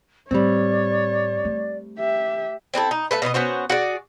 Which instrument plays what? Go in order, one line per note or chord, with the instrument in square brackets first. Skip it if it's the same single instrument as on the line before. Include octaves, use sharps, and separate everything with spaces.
[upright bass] A2 [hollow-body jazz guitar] G3 C4 [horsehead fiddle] C#5 [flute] D5
[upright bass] A3
[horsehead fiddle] G4 E5
[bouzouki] C4 D4 E4 A4
D#4
A3 A4 B4
B2 B3 E4 D#5
B3 C#4 F#4 C5
F#4 G#4 D5